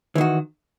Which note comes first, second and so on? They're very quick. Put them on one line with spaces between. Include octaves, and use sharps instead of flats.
E3 D#3 F#4